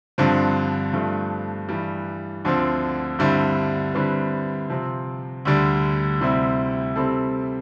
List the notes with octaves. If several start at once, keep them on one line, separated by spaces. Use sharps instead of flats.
G2 D3 F3 C4
G2 F3 A3
G2 E3 G3
D2 D3 F3 C4
G2 D3 G3 C4 E4
D3 G3 C4 E4 B4
C3 F3 C4
D2 D3 G3
D2 C3 G3 C4 E4
C3 G3 C4 E4 A4